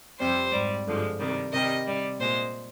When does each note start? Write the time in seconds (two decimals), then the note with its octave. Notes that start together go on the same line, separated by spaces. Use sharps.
0.19 F2 C3 G3 C5
0.52 G#2 G3
0.86 G2 D3 F3 G#3
1.19 C3 D#3 G3
1.52 C3 D#3 G3 D#5
1.86 C3 G3
2.19 A#2 G#3 C5